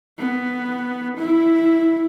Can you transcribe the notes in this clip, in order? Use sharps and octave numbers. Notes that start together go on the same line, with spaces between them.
B3
E4